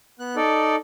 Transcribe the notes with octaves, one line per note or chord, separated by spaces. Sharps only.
B3 F#6
D#4 A4 D5